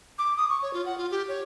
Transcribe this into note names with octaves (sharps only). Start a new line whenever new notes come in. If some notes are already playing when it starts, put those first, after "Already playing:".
D6
D#6
C#6
C#5
F4
F#5
F4
G4
C#5